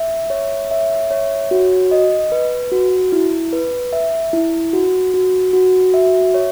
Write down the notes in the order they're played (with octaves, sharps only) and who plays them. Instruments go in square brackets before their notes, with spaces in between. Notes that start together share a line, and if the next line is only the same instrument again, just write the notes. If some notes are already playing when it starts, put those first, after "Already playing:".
Already playing: [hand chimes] E5
C#5
E5
C#5
F#4
D#5
B4
F#4
E4
B4
E5
E4
F#4
F#4
F#4
E5
C#5